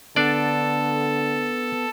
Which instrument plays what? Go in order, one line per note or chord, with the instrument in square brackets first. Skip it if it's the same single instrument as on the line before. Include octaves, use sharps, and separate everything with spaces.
[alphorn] D3 [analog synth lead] B3 [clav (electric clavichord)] D4 D5 [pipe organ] A4